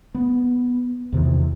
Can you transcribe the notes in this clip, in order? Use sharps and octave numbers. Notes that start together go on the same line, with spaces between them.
B3
E2 C3 D#3 E3